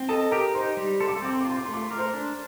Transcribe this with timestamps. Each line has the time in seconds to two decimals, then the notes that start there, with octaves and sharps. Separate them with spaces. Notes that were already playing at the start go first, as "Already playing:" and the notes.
Already playing: C4
0.09 A4 D#5 A5
0.31 G4 A#4 A#5
0.54 D#4 C5 C6
0.77 G3
1.00 A4 C6
1.08 D6
1.16 C6
1.22 C4 D6
1.33 C6
1.41 D6
1.45 F4 C6
1.57 D6
1.65 A3 C6
1.74 D6
1.82 C6
1.91 A#4 D6
1.98 C5 C6
2.14 D4